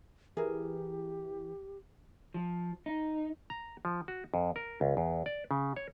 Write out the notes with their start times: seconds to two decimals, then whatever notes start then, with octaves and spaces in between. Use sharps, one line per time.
0.37 E3 G4 G#4 A#4
2.34 F3
2.86 D#4
3.50 A#5
3.85 F3
4.08 F#4
4.34 F2
4.56 A#4
4.81 C#2
4.97 E2
5.26 D5
5.51 C#3
5.76 C#5